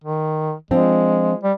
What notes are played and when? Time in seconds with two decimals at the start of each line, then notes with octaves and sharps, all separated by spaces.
0.04 D#3
0.71 F3 G#3 C4 D4
1.43 G3